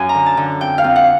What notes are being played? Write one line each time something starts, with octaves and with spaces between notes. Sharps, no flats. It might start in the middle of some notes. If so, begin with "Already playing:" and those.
Already playing: F#2 G#5
A#5
D3
A5
D3
F2 G5
F5
F2
F#5